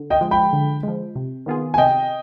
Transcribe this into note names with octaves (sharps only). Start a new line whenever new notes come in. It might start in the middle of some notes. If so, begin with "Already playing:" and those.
Already playing: D3
D#5 G5
F3 G#3
G5 B5
D3
F3 G#3
C3
D#3 B3 F4 G#4
G#5
C3 D#5 G5